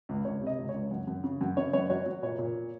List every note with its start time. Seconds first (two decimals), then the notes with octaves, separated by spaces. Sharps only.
0.09 C#2
0.25 C#2 C#5
0.41 C3
0.47 D#5
0.58 C#2
0.69 C#5
0.74 C#2
0.91 F#2
1.07 F#2
1.24 C#3
1.41 F#2
1.57 C#3 C#5
1.73 F#2 C#5
1.90 F#3 C#5
2.06 F#3
2.23 A#2 C#5
2.39 A#2